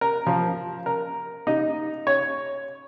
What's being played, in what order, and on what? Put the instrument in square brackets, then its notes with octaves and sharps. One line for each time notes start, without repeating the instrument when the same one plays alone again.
[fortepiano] A#4
F3
A#4
D#4
C#5